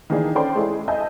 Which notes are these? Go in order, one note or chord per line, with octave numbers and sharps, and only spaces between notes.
D#3 E3 A#3 D4 G#4 D5
C#4 A4 C5 D5 G5 C6
G#3 E4 G#4 A4
D#5 E5 G#5 A5 G6